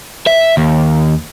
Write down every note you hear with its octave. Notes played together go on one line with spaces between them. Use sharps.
E5
D#2